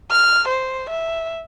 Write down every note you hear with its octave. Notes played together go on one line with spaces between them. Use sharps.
F6
C5
E5